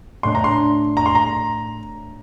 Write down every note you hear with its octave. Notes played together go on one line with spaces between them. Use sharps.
A2 A3 D4 C6
A#5
C6
A#5
C6
A#5